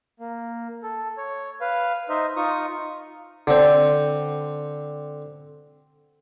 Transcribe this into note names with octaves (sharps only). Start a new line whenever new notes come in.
A#3
A4
C#5
B4 F5
D#4 C5 D#5 E5
D#4 F4 C#6 D#6
D3 C4